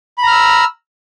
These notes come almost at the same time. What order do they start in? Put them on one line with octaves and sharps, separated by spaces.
B5 A#5 F6 E6